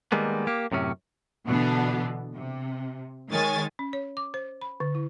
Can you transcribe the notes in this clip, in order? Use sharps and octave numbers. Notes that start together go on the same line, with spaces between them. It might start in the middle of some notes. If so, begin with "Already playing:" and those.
D#3 G3 G#3 A#3 B3
A#3 G4
F#2 A2 C3 C#4
B2 D3 E3 B3 D4
C3
D#3 G#3 C#5 G#5 A6
C#4
C#5
D6
C5
B5
D3
E4